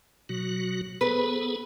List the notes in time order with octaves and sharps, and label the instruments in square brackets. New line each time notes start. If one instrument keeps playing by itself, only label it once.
[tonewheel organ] B2 F#3 F#4
[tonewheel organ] B3 G#4 A4 [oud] B4